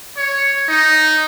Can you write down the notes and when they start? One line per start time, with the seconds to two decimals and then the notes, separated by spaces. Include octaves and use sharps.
0.17 C#5
0.69 D#4